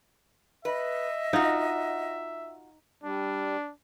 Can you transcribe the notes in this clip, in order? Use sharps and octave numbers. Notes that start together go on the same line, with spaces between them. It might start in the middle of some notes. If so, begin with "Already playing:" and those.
B4 D#5 E5
D#4 F4 F#4
G3 D4